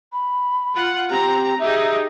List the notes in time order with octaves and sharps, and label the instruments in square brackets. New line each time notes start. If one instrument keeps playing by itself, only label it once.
[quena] B5
[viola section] F4 F#5
[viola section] C4 A#5 [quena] G4
[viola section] D#4 G4 G#4 [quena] E5